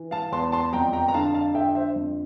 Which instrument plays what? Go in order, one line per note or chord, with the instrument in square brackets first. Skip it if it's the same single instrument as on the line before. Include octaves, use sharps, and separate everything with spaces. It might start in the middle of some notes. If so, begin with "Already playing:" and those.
Already playing: [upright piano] E3
F5 A5
E2 A5 C6
A5 C6
F2 G5 A#5
G5 A#5
A#5
D3 F5 A5
F5 A5
D3 E5 G5
C5 E5
F2